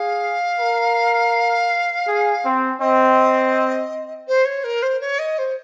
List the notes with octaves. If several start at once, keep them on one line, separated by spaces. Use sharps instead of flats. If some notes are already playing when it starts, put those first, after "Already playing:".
Already playing: G#4 F5
A#4
G#4
C4
C4 D#5
C5
C#5
A#4
C5
C#5
D#5
C5